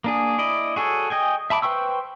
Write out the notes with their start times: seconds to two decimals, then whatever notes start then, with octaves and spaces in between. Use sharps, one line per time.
0.04 A#3 D4 G#4
0.38 E4 D5 D#5
0.76 F#4 G#4 A4 C#5
1.10 D#5 G5 G#5
1.50 E5 A5 B5 D6
1.62 B4 C5 G5 C#6 E6